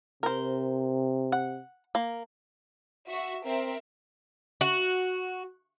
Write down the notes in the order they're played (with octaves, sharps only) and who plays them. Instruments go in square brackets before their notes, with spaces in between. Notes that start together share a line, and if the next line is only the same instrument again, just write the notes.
[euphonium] C3 [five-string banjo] A#4 C5
[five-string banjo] F#5
A#3
[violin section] F#4 E5
C4 A#4 E5
[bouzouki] F#4